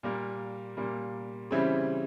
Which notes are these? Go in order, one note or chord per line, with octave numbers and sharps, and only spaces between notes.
A#2 G3 A#3
A#2 G3 A#3
C#3 E3 G3 C4 E4